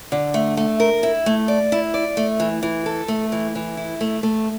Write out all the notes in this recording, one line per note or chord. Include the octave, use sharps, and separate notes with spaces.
D3
A3
A3
A#4
E4
A3
D5
E4
D5
A3
E3
E3
A4
A3
E3
E3
E4
A3
A3